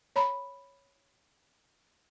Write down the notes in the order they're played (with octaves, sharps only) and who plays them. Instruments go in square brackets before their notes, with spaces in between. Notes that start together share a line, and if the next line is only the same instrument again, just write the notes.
[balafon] C#5 A#5 B5